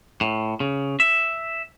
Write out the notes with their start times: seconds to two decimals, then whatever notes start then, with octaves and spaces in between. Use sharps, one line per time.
0.21 A2
0.60 C#3
1.00 E5